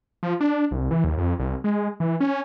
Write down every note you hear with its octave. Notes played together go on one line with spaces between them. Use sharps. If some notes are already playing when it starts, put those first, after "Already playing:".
F3
D4
C2
E3
D#2
F2
C2
G#3
E3
C#4